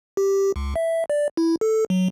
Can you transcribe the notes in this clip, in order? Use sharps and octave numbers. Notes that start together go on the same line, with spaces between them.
G4
C#2
E5
D5
E4
A4
F#3